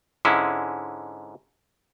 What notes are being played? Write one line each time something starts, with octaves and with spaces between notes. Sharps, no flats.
G#2 D3 G#3 C#4 E4